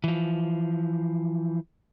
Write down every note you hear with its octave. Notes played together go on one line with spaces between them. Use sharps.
E3 F3